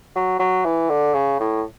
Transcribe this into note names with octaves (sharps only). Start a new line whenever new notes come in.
F#3
F#3
E3
D3
C#3
A2